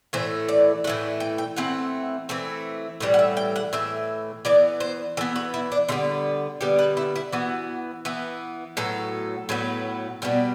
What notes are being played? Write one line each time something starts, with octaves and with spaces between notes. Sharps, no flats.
A2 E3 A3 C5
D5
A2 E3 A3 F#5
G5
G5
E3 A3 C4 F#5
E3 A3 C4
A2 E3 G3
F#5
E5
G5
F#5
A2 E3 E5
E3 B3 D5
C5
E3 B3 A4
F#4
E4
D4
D3 G3 B3 E4
D3 G3 B3 G4
B4
E4
E4
E3 B3 F#4
E3 B3
A2 F#3 B3 A4
A2 F#3 B3
B2 G3 B3